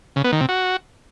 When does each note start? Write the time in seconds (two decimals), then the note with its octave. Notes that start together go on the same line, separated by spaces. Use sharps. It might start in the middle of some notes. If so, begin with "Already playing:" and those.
0.16 C#3
0.24 B3
0.32 D#3
0.41 C3
0.49 F#4